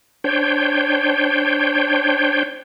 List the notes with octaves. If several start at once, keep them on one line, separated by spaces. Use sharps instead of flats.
D4 C5 C#5 G5